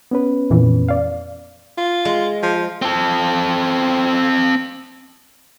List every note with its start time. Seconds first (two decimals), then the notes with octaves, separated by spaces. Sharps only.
0.11 B3 C#4 B4
0.50 F2 A#2 E3
0.88 D5 F5
1.78 F4
2.05 G#3
2.43 F3
2.82 C4 A4